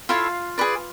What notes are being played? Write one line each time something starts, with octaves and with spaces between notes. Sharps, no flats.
E4 F4 A4 C#5 F5
G#4 B4 D5